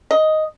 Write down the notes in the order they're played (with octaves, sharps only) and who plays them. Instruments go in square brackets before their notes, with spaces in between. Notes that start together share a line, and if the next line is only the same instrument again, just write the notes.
[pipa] D#5